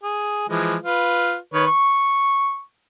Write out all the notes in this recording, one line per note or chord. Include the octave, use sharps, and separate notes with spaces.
G#4
E3 F3 G#3
F4 B4
D#3 B4 C#5
C#6